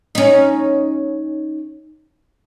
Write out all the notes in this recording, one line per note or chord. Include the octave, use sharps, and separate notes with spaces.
C#4 D#4